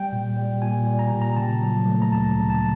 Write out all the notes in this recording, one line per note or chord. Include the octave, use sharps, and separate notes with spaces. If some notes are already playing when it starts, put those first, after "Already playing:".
Already playing: G3 G5
A#2
G3
A#2 G#5
G3
A#5
A#2
A#5
C#3 A5
F#3
A3
A#5
D2 A5
C#3
A5